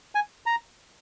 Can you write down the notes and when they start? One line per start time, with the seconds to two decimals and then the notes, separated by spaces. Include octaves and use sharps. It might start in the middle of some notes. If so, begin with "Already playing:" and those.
0.15 G#5
0.46 A#5